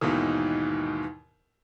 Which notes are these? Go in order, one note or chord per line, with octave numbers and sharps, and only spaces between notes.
D#2 G#2 B2 D#3 E3